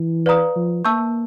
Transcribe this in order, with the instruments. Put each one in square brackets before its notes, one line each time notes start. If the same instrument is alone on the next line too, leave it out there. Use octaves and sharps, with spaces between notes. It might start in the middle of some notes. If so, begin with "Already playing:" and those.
Already playing: [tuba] E3
[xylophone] B4 D5 F5 A#5 D#6
[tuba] F3
[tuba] A#3 [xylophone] E5 A5 C#6 E6 G6